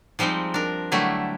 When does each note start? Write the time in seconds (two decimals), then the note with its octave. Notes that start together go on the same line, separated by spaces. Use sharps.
0.19 F3 G3 G#3 C4 D#4
0.54 D4 A#4
0.92 D3 F#3 G3 A3 E4